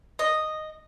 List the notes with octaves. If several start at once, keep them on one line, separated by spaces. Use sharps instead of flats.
D#5